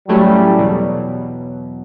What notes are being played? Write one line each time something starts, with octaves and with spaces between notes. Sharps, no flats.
A2 F#3 G3 A3 C#4 E4
E2 B2 F#3